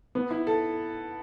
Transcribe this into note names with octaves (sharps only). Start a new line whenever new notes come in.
B3
E4
A4